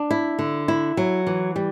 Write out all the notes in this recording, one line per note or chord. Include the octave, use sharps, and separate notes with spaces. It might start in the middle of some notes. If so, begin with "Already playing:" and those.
Already playing: D4
E4
D3
E4
F#3
E3
G3